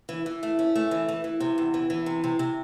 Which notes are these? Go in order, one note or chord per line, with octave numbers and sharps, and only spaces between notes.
E3
E3
A3
C#4
A3
E3
E3
E3
C3
E2
E3
E3
C3
C3
C3